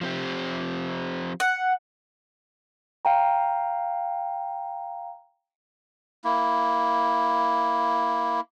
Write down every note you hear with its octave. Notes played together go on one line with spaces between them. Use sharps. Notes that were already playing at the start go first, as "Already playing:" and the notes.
F3 C4 G4
F#5
F5 G5 A#5
A#3 E4